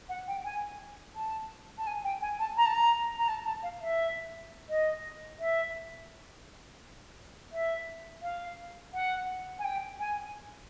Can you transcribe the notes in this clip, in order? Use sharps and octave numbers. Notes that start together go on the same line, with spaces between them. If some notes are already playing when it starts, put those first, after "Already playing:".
F#5
G5
G#5
A5
A5
G#5
G5
G#5
A5
A#5
A5
A#5
A#5
A5
A5
F5
E5
D#5
E5
E5
F5
F#5
G#5
G5
G#5